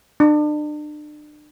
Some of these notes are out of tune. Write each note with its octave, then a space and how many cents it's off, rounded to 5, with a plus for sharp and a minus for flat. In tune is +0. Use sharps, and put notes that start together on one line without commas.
D4 +35